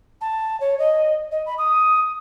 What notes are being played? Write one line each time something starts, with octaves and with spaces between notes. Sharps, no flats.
A5
C#5
D#5
D#5
B5
D#6